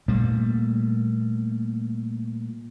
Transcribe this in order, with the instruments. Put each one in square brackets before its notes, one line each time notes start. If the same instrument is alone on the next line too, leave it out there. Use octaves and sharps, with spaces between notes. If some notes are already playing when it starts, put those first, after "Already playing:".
[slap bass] A#2 G3 A3 A#3